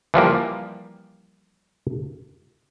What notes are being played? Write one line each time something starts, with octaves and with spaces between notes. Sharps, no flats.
E3 F3 G3 A#3